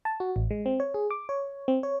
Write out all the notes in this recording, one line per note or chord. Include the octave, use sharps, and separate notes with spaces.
A5
F#4
A1
G#3
C4
C#5
G#4
D6
C#5
C4
C#5